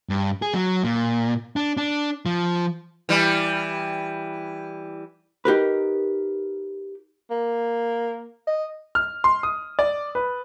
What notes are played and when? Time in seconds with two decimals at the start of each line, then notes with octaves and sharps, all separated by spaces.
0.09 G2
0.42 G#4
0.54 F#3
0.84 A#2
1.56 D4
1.77 D4
2.26 F3
3.09 E3 G3
5.45 D#4 G4 A#4 B4
7.31 A#3
8.47 D#5
8.95 F6
9.24 C6
9.43 D#6
9.79 D5
10.15 B4